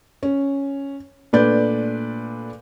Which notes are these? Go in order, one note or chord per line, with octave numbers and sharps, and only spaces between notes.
C#4
A#2 A3 D4 B4 D5 G6